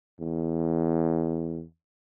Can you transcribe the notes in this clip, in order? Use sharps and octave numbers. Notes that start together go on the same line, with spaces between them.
E2